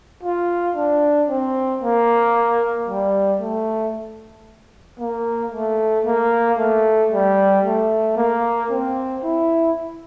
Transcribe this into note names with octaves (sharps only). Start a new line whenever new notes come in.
F4
D4
C4
A#3
G3
A3
A#3
A3
A#3
A3
G3
A3
A#3
C4
E4